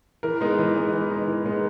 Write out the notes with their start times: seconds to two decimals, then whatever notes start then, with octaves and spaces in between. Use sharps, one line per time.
0.23 E3 A#4
0.41 G#3 B3 D#4
0.59 E3
0.76 G#3 B3 D#4
0.93 E3
1.10 G#3 B3 D#4
1.28 E3
1.45 G#3 B3 D#4